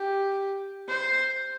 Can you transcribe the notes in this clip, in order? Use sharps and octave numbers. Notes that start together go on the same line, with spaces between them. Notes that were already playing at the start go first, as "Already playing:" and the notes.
Already playing: G4
C5